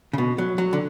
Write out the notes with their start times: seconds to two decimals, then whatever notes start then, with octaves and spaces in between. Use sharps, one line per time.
0.13 C#3
0.18 B2
0.38 F#3
0.58 F#3
0.73 D3